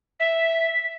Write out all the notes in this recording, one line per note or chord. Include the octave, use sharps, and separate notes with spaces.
E5 B6